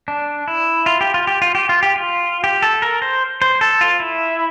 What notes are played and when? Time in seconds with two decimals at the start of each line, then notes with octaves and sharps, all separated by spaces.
0.08 D4
0.48 E4
0.86 F4
1.01 G4
1.14 F4
1.27 G4
1.42 F4
1.55 G4
1.69 F4
1.83 G4
1.96 F4
2.44 G4
2.62 A4
2.82 A#4
3.02 C5
3.42 C5
3.61 A4
3.81 F4
4.00 E4